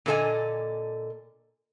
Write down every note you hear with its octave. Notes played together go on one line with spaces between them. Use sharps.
A#2 D3 A#3 A4 D#5 G#5